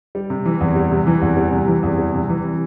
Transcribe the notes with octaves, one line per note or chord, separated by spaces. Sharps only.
G3
C3
E3
E2
G3
C3
E3
E2
G3
C3
E3
E2
G3
C3
E3